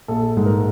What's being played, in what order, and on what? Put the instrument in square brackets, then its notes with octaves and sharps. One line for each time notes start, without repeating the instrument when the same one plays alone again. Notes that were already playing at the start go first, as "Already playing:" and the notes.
[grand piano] A#1 A4
G#2
A#4